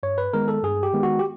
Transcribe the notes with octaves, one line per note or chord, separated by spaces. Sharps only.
G2 C#5
B4
D#3 G#3 B3 A#4
A4
G2 G#4
G4
D#3 G#3 B3
F#4
G4